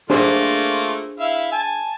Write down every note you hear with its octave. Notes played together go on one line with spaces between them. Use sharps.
A3 A#3 D4 F4 G#4 C5
E4 E5 F5
G#5 A5